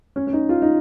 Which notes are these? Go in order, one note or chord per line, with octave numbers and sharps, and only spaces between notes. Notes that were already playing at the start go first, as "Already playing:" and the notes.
C#4
C#4
D#4
F4
D#4